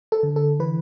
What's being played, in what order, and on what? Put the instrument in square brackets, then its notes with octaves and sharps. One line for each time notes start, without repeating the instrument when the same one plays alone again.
[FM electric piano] A4
D3
A4
E3 B4